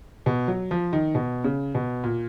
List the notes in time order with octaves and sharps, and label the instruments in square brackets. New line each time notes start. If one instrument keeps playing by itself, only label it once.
[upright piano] B2
F#3
F3
D#3
B2
C#3
B2
A#2